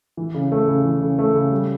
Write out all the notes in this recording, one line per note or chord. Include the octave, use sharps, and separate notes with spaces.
E3
C#3
A3
C#3
E3
C#3
A3
C#3
G3